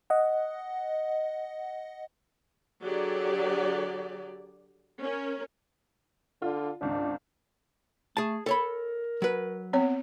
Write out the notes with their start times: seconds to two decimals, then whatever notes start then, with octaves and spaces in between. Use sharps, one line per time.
0.10 D#5 F#5
2.83 D3 F#3 G4 G#4 D5
5.03 C#4 A#4
6.42 D3 F4
6.81 G#1 C#2 D4
8.17 A3 G#4 A5
8.46 A4 A#4 C#5 B5
9.22 F#3 B4
9.73 B3 C4 C#5